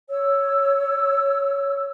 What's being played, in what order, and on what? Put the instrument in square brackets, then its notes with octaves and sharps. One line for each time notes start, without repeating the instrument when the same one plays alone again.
[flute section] C#5 E6